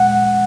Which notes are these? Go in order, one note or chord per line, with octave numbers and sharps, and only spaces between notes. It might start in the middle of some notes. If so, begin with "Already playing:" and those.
Already playing: A#2 G#3 F#5